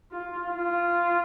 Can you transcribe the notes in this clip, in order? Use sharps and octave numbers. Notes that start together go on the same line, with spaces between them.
F4
F4